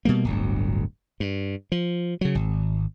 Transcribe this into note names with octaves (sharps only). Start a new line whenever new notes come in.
B2 G3 A#3
D1 G1 D2
G2
F3
C#3 F#3
G#1